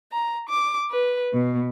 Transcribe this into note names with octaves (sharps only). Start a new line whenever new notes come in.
A#5
D6
B4
B2